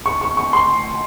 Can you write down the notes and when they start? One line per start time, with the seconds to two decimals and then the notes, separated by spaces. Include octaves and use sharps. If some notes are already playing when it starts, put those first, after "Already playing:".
0.06 C#6
0.21 C#6
0.37 C#6
0.53 C6